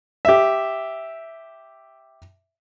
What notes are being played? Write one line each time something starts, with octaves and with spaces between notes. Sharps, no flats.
G4 E5